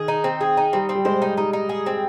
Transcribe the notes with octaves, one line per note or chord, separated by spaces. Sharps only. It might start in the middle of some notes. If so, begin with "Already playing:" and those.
Already playing: D#3 G#4
D#4
C4
G#4
D#4
G3 C4
C4
G3
G#3 C5
D#4
G3 D#4
D#4
G#4
C4